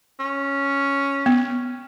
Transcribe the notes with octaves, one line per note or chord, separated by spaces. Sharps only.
C#4
B3